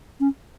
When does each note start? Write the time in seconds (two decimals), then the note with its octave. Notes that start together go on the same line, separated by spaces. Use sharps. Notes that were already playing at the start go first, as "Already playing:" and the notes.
0.20 C#4